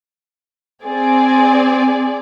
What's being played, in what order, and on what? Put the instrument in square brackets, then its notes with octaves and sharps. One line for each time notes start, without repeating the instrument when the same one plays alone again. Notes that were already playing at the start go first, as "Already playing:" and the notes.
[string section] C4 G#4 D5